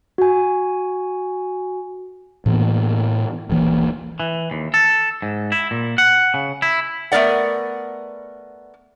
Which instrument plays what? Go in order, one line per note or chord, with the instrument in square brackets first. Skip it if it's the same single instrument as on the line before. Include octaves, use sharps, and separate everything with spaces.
[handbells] F#4 G#5
[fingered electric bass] A2 E3 A#3 B3
D#1 A#1 E3 A#3
[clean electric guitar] E3
D#2
A4
G#2
E4
A#2
F#5
C#3
E4
[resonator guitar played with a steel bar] A3 B3 A#4 D5 F#5